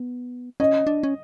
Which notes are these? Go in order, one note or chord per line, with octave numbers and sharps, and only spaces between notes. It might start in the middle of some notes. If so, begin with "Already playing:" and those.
Already playing: B3
C#4 D#5
D4
C#4